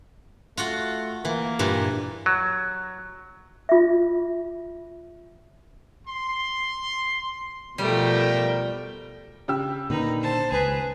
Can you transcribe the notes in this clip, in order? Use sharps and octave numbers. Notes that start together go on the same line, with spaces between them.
A3 F4 F#4 F#5
E3 A#3
G2 A#2 E3
F#3
F4 E5
C6
B2 F3 G3 A3 A#4 G5
C#3 G4 E6
A#2 D3 D#3 D#4 B4
C5 A5
C#2 G#4 B4